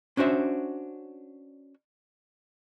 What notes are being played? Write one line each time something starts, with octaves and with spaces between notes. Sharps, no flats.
C#4 D4 F#4 C5 E5